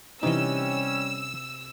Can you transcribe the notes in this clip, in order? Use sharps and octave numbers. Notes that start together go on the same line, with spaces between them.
C3 E3 G3 C#4 D#4 D#5 E6